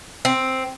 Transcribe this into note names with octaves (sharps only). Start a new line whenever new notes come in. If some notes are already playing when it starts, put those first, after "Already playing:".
C4